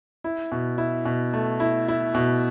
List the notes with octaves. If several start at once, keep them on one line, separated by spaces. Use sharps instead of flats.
E4
B2
E4
B2
A3
E4
E4
B2